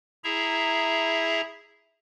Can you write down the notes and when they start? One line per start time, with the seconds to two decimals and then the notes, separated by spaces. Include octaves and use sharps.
0.24 E4 G#4 E5 A#5